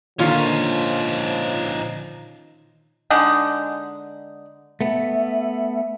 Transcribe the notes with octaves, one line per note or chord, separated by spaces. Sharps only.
A#2 D3 D#3 F3 C#4 D#4 F4
D3 G#3 D#4 F#5
A3 B3 E5